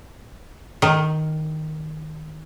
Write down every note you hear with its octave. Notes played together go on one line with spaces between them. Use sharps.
D#3